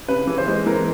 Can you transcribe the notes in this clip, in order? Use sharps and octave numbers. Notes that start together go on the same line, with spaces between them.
C#3 B4
E3
C5
G#3
E3 A#4